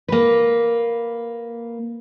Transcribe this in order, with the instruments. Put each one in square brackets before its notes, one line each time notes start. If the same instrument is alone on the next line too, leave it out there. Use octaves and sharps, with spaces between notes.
[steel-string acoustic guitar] A#3 B4